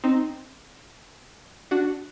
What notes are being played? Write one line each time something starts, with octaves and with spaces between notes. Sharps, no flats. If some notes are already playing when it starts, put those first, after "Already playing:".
C4 D#4
D4 F#4